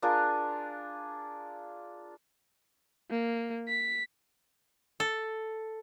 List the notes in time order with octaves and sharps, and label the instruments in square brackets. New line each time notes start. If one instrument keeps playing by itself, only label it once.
[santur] D4 F4 G#4 A#4
[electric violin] A#3
B6
[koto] A4